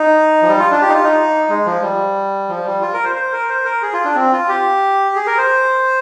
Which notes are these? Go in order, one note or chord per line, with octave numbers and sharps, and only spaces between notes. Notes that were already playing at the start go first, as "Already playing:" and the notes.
Already playing: D#4
F3
G3
F4
D4
G4
D#4
F4
D#4
G#3
F3
G3
F3
G3
F4
A#4
C5
C5
A#4
C5
A#4
G#4
F4
D4
C4
F4
G4
G#4
A#4
C5